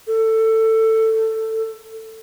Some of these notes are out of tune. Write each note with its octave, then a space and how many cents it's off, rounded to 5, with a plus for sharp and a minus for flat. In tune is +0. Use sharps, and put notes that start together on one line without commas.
A4 +15